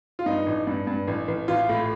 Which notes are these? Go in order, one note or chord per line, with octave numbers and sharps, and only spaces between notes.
F4
G2 D#4
A1
G2
G2
A1
A1
A1 F4
A2